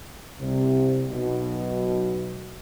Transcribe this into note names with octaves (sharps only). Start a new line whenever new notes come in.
C2 C3
B1 B2